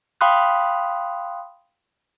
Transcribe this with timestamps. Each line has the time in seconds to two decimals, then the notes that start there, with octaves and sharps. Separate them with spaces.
0.21 F5 G5 B5 C6 D#6 F#6